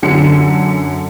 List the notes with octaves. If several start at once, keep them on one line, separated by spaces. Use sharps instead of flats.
F#2 D3 C#7